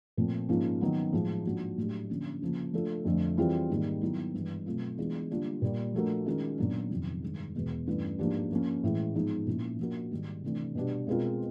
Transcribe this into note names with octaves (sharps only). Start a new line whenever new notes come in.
A#2 F3 A3 C4
G#2 F3 A#3 C#4 F4
D#3 F#3 B3
A2 F3 G#3
G#2 F3 A#3 D4 F#4
A2 F#3 A3 D4 G4
D3 F3 A#3 C#4
C#3 F3 A#3
F3 A3 D4 F4 A4
F2 D3 F3 A3 D4
E3 G3 C4 F4 G#4
G#2 D#3 G3 A#3
D#3 F#3 B3 E4
G2 E3 G#3
B2 F#3 A3 C4 F4
E3 G#3 B3 D4 F4
D3 G3 A#3 D4 F4
A#2 G3 A#3
F3 A3 D4 F#4 A#4
D#3 G#3 C#4 F4 A#4
A#2 F#3 B3 D4
F2 C3 D#3 F#3
G2 D#3 G#3
E2 B2 G#3 B3
G2 E3 A3 C#4 E4
G#2 F3 A#3 D4 G4
F3 A#3 C#4
A2 E3 G#3
G#2 F3 G#3 B3 D#4
A#2 F3 A#3 C#4 E4
F3 A#3 D4 F#4 A#4
G#2 D#3 G3
C3 E3 A3 D4
B2 G3 B3 D4 G4
B2 G#3 C4 F4 A#4